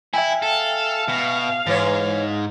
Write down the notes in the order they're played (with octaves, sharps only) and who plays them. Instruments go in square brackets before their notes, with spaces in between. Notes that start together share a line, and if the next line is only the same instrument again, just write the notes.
[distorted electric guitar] E4 [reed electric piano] E5 G5 G#5
[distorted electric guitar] A4 [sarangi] F5
[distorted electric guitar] B2
[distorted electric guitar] G#2 [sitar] E3 C#5